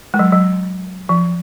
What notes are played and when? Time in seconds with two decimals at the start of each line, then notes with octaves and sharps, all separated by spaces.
0.14 G#3
0.19 F#3
0.32 F#3
1.09 F3